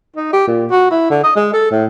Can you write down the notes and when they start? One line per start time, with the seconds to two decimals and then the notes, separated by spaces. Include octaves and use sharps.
0.16 D#4
0.32 G4
0.47 A#2
0.70 F#4
0.90 E4
1.10 D3
1.23 D#5
1.36 G#3
1.53 A4
1.71 A2